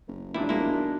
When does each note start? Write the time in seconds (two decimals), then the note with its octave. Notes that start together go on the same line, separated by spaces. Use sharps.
0.07 F#1
0.34 F1 A#2 E3 G3 D4 E4
0.49 B2 F#3 G#3 A#3 E4
0.69 D#2